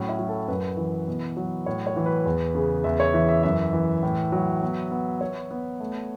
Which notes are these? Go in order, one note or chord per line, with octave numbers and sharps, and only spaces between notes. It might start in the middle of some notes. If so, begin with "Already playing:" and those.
Already playing: A2 F#3 C#4
E4
F#3
A4
F#2 B4
E3
B2
F#3
A2 C#5
C#5
E3
B4
E2
C#3
E2 E5
C#5
E3 E5
E5
F#2 E5
E3
A2
F#3
B3
B3
B3 C#5
B3
A3